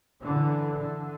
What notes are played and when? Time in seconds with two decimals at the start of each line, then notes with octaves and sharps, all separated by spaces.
0.23 D3 E3
0.78 D3